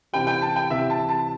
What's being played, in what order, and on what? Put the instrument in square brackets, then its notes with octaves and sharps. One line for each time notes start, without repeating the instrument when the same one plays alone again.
[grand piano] C3 E3 C4 G4 [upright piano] G5
[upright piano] G5
A5
G5
[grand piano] C3 E3 C4 G4 [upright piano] E5
[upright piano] A5
A5